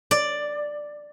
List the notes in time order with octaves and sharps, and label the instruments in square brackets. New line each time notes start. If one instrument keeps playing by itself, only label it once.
[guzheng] D5